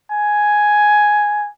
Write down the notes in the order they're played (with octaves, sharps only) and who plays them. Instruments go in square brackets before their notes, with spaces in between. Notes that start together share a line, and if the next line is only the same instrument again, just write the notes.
[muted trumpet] G#5